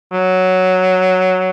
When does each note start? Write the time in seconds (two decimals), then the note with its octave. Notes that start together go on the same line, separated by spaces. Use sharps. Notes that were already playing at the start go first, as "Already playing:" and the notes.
0.13 F#3